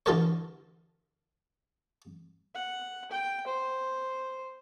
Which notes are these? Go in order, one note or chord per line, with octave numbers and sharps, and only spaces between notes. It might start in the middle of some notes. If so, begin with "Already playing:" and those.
D3 E3 G4 A4 A#4 C#5
F#5
G5
C5